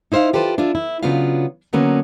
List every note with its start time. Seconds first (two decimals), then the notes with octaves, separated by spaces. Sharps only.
0.12 D#4 E4 C5 E5 F5
0.33 F4 G4 A4 B4 C5
0.58 D4 E4 F4
0.75 E4
1.03 C#3 F#3 B3 D4 F4 F5
1.73 D3 F#3 A#3 B3 C#4